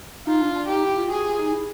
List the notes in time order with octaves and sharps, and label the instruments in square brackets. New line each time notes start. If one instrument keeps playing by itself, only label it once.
[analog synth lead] D#4 [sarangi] F4
[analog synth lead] D4
D4
[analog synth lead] D#4 [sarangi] G4
[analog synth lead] E4
F4
[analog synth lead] F#4 [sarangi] G#4
[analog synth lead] F4
D#4
E4